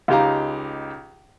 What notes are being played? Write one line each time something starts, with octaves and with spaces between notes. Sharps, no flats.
C#2 D#4 G4 F5 A#5